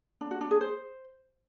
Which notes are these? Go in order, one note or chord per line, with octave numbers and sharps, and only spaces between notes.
D4
F#4
D4
G#4
C5